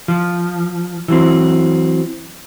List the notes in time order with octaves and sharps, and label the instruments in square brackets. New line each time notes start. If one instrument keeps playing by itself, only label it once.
[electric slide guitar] F3
E3 F#3 C4